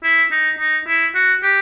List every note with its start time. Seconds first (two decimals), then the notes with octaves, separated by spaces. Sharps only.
0.03 E4
0.31 D#4
0.59 D#4
0.87 E4
1.15 F#4
1.43 G4